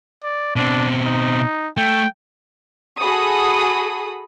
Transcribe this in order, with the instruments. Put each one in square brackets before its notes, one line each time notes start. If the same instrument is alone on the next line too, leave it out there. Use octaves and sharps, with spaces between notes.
[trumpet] D5
[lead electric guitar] B2 C4 [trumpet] D4
[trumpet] D#4
[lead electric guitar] A3 [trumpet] G5
[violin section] F#4 G#4 A4 B5 D#6